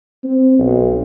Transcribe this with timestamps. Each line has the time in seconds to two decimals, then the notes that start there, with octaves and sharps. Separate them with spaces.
0.24 C4
0.59 B1